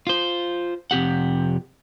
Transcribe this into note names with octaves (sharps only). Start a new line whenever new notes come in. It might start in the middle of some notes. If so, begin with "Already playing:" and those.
F4 C5
F2 C3 G4 F#5